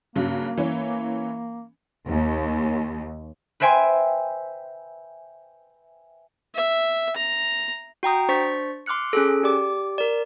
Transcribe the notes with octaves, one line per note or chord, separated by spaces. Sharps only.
G2 C#3 F#3 A#3
E3 C#4
D#2
B4 C5 E5 G5 G#5 C6
E5
A#5
F#4 G5 A#5 D#6
D4 C5 C#6 A6 B6
C6 D6 F6 F#6 C#7
C#4 G#4 A4
G4 D5 D6
A#4 D5